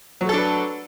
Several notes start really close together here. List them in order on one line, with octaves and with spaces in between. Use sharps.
F#3 A3 A4 D4 B4